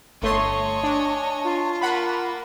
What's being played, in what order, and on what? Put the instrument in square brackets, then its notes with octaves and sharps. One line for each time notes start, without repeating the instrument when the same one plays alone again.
[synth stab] G1 A3 C6 [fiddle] C#5 D#5 [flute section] A5 C#6
[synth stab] D4 [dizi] G#5
[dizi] F4
[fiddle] A#3 [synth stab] F#5 B5